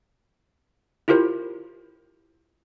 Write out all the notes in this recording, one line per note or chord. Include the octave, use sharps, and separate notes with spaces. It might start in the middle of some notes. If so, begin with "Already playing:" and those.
E4 F4 G4 A#4 C5